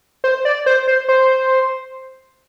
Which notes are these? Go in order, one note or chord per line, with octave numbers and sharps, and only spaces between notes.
C5
D5
C5
C5
C5